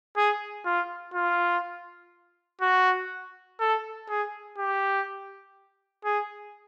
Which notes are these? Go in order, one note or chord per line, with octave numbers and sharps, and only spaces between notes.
G#4
F4
F4
F#4
A4
G#4
G4
G#4